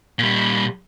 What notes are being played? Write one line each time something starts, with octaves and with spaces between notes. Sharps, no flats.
A#2 G3